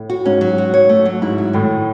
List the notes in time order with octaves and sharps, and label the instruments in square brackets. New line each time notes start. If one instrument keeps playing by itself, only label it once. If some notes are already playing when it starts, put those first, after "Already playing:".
Already playing: [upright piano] A2
[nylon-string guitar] F#4
[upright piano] G#2 [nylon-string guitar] C#4
[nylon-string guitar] F#3
F#4
C#5
A3
F#3
[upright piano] G#2 [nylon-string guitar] E4
[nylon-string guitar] F#3
[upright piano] A2 [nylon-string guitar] D#3